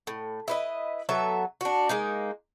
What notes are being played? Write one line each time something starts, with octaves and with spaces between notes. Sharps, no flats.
A2
E4 B4 D#5
F#3 B3 A4 E5
D4 F#4
G#3 A#3 D#4